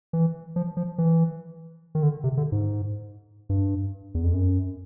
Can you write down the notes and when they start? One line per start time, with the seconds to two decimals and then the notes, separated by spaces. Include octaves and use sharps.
0.13 E3
0.56 F3
0.77 F3
0.98 E3
1.95 D#3
2.03 D3
2.24 C3
2.37 D3
2.52 G#2
3.49 G2
4.15 E2
4.24 F2
4.34 F#2